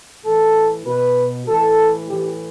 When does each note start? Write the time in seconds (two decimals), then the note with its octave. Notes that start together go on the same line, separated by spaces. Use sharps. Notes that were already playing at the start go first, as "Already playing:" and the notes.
0.25 A2 E3 A4
0.85 B2 B4
1.47 A2 E3 A4
2.08 A2 E3 G4